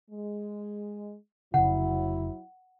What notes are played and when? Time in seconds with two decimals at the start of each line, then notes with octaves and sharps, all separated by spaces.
0.10 G#3
1.54 F1 C#3 F#3 E4 F#5